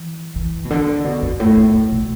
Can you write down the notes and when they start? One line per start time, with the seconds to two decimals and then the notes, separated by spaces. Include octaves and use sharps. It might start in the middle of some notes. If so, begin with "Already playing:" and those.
Already playing: E3
0.36 E3
0.65 B2
0.70 D3
1.04 B2
1.22 F#2
1.40 A2
1.56 B3
1.75 A3
1.92 B2